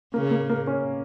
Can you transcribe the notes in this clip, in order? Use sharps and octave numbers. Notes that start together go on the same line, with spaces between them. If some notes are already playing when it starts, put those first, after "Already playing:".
C#3 A#3
A#3
A#3
C#4